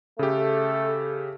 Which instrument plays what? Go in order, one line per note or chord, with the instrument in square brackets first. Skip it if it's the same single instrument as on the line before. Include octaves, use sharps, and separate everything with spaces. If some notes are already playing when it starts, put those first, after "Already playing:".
[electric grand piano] C#3 G4 [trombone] A3 [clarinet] A4